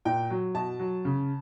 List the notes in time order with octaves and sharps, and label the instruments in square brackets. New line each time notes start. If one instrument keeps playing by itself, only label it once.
[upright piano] A#2 G5
F#3
B2 A5
F#3
C#3